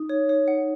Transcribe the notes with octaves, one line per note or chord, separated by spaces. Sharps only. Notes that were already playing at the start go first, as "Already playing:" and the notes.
Already playing: D#4
C#5
C#5
F#5